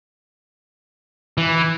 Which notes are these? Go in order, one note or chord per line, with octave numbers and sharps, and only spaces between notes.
E3